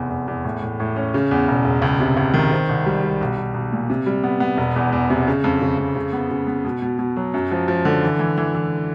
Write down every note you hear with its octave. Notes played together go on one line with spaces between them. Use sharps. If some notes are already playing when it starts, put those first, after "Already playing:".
Already playing: F1 E2
E2
E2
A2
A2
A2
C#4
C#3
E2
E1
E1
C#2
C3
C#2
D#3
C4
C2
G3
G3
B1
B1
B1
A#2
C3
G3
B3
B3
E1
E2
E2
C3
C#3
F2
C#3
F2
C#3
B3
C#3
B3
B2
B2
B2
F#3
F#2
F3
F3
D3
E3
E3
E3
E3